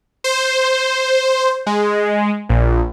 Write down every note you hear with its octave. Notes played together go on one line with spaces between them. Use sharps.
C5
G#3
A#1